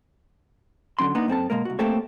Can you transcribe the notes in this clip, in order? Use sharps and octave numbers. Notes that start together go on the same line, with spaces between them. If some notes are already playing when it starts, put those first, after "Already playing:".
D3 F#3 C#4 C6
A#3 B3 D4 D#4
F#2 C4 A4 A5
B2 G#3 A#3 A#4
C2 F#4
A3 A#3 C4 G4 A4 C#5